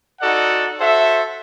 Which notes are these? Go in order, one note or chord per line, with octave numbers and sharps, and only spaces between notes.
D#4 F#4 A4 D5 F#5
F#4 A4 C5 E5